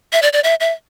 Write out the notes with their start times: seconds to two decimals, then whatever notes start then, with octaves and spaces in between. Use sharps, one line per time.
0.13 E5
0.22 D5
0.33 D5
0.44 E5
0.60 E5